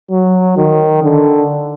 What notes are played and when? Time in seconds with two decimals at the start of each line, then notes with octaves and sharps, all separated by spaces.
0.11 F#3
0.57 D#3
1.03 D3